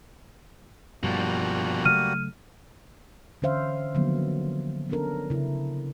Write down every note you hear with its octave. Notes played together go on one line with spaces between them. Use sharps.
G2 B2 F3 G3 A#3 F#4
C#3 F#3 A3 F6 D#7
D3 E3 C#4 C5 E5 F5
D3 D#3 F3 F#3 A#3 B3
B3 C#4 D4 A4 A#4
C#3 E4